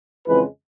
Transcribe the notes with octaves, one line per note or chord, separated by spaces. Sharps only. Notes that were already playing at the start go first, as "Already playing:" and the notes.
F2 C#3 E3 G#3 C4 B4